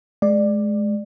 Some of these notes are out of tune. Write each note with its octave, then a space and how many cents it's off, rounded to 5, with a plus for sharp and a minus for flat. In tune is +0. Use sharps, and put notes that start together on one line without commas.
G#3 +25 D5 +15